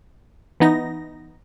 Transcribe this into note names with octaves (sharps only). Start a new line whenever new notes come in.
E3 B3 D#4 A#6